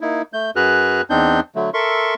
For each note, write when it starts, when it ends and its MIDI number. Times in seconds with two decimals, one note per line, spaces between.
0.01 0.22 58
0.01 0.22 63
0.01 0.22 64
0.33 0.51 57
0.33 0.51 91
0.56 1.02 42
0.56 1.02 66
0.56 1.02 68
0.56 1.02 71
0.56 1.02 89
0.56 1.02 90
1.10 1.40 40
1.10 1.40 60
1.10 1.40 62
1.10 1.40 63
1.10 1.40 91
1.55 1.70 50
1.55 1.70 54
1.55 1.70 57
1.74 2.14 69
1.74 2.14 70
1.74 2.14 76
1.74 2.14 84
1.74 2.14 85